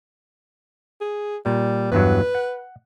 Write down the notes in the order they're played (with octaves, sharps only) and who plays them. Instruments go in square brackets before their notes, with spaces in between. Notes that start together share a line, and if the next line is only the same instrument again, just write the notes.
[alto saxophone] G#4
[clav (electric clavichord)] A#2 [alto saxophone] G3
[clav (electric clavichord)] E2 G2 F#3 [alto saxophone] B4
[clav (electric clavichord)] F#5